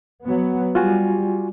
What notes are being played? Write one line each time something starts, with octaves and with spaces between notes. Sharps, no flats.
F#3 B3
G3 F4 F#4 G#5